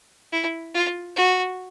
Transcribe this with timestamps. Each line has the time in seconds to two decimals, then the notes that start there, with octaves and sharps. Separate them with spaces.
0.32 E4
0.74 F4
1.16 F#4